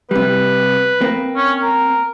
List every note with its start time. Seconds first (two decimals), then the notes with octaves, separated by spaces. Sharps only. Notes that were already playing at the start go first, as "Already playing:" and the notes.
0.11 C3 G3 B4
1.01 A#3 C4
1.37 C#4
1.62 A#4